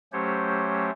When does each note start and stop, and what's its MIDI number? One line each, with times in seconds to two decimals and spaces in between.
0.12 0.90 54
0.12 0.90 57
0.12 0.90 61
0.12 0.90 67
0.12 0.90 72
0.12 0.90 73